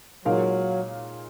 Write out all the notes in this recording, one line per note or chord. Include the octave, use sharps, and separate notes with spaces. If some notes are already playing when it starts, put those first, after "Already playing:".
A#2 F#3 G#3 D#4 A#4 F5